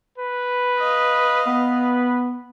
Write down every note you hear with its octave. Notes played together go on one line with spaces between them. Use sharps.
B4
D#5 F5
B3 B4